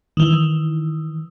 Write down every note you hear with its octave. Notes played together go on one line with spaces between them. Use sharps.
D#3 E3